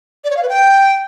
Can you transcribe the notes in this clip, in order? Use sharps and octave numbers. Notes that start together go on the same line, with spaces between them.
D5
C#5
F5
B4
G5